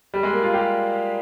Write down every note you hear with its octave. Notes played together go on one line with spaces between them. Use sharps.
G3
G#3
A#3
F4
G4